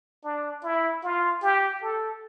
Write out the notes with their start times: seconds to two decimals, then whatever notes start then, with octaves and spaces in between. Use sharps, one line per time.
0.24 D4
0.64 E4
1.03 F4
1.42 G4
1.82 A4